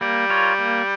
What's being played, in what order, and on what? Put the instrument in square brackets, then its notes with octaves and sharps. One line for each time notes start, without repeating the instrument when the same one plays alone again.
[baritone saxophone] G3 [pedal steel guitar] A#3
[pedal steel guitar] F4 A#4 C#5
A#3